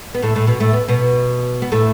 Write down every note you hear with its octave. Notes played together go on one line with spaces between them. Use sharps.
B3
A2 A3
A2 A3
B2 B3
A2 A3
B3
B2 B3
B3
A2 A3